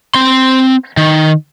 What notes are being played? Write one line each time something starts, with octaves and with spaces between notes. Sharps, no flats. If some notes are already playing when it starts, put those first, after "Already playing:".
C4 C6
D#3